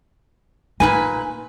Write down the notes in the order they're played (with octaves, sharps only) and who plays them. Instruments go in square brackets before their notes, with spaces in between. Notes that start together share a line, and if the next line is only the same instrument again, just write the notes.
[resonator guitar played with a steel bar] A#2 B4 G#5 [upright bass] D#4